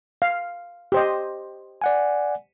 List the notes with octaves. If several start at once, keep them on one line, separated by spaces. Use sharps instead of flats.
F5
G4 C5 D#5
D5 F#5 G#5